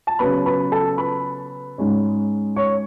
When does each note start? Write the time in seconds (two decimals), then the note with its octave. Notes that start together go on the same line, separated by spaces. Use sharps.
0.07 A5
0.19 C#3 F#3 B3 B4 B5
0.46 B4 B5
0.72 A4 A5
0.98 B4 B5
1.78 G#2 G#3 C#4
2.56 C#5 C#6